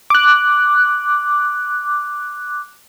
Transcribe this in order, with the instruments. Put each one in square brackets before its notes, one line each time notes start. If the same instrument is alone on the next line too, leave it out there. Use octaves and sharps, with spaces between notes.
[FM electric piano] D6 F#6